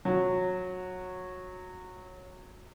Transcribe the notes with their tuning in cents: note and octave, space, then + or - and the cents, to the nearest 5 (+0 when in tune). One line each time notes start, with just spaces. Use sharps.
F#3 -15